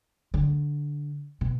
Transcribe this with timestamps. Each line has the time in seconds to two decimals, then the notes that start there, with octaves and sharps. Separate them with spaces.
0.34 D3
1.41 B2